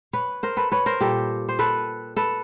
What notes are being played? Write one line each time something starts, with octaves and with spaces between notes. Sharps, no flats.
B4 C#5
A#4 C5
A4 B4
B4 C#5
A#4 C5
A#2 G3 G4 A4
C5
A4 B4
A4 B4